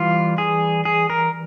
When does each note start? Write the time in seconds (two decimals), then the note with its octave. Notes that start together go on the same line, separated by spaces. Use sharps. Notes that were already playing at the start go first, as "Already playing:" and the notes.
Already playing: E3 G3 F4
0.38 G#4
0.85 G#4
1.10 A#4